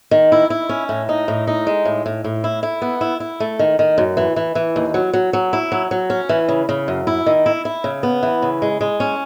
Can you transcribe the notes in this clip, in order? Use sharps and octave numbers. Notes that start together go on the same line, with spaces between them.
D#3
E4
E4
C#4
A2
D#4
A2
D#4
G#3
A2
A2
A2
E4
E4
B3
E4
E4
A3
D#3
D#3
F#2
E3
E3
E3
D#2
F#3
F#3
F#3
E4
F#3
F#3
C#4
E3
C#3
C#3
F#2
E4
D#3
E4
E4
C#3
B3
E3
C#3
G#3
G#3
C#4